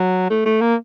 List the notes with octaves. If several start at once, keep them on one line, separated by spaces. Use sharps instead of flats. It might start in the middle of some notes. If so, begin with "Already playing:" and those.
Already playing: F#3
A3
A3
A#3